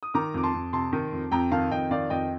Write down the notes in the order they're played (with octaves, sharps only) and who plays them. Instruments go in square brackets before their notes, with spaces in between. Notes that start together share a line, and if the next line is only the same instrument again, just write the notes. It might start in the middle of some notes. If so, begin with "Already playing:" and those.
[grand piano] D#6
D#3 A#5 D6
F2 D6
A5 C6
F2
C3 A5 C6
D#3
F2
F2 G5 A#5
D#3 F5 A5
F2 D#5 G5
D#3 D5 F5
F2 D#5 G5